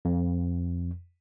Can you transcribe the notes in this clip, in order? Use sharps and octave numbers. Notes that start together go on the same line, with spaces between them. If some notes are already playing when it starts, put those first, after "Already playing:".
F2